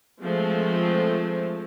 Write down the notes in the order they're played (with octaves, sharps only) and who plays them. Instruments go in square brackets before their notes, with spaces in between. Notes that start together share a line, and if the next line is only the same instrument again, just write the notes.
[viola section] F3 G#3 A3 C4